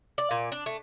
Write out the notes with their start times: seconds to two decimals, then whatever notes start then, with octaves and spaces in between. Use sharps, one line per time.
0.18 D5
0.31 A#2
0.52 D4
0.66 A3